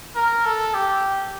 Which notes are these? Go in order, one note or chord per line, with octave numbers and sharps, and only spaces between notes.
A#4
A4
G4